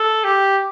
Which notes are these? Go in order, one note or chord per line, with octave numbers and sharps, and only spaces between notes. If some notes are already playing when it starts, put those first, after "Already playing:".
Already playing: A4
G4